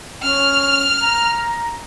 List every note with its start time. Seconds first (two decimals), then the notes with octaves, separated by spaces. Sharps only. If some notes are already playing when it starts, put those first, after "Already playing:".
0.23 C#4 F6
1.01 A#5